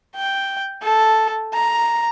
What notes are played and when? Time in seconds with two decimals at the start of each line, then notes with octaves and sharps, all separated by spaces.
0.16 G5
0.83 A4
1.54 A#5